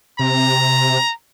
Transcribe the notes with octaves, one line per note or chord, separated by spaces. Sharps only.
C3 A#5